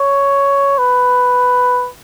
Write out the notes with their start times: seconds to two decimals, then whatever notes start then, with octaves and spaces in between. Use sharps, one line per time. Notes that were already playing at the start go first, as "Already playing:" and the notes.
Already playing: C#5
0.79 B4